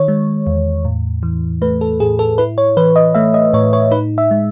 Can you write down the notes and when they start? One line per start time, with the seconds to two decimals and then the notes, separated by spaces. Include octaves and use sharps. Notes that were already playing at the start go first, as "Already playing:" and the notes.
Already playing: D#3 C#5
0.08 G#3
0.47 E2
0.85 A2
1.23 E3
1.62 A3 B4
1.81 A4
2.00 A2 G#4
2.19 A4
2.38 E4 B4
2.58 C#5
2.77 E3 B4
2.96 D#5
3.15 A3 E5
3.34 D#5
3.53 A2 C#5
3.73 C#5
3.91 D#4 B4
4.18 E5
4.31 G#3